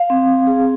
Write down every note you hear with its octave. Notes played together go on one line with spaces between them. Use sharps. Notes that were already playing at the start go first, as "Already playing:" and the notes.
Already playing: F5
C4
G#4